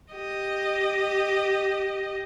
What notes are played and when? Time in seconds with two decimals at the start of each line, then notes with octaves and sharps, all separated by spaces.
0.13 G4 D#5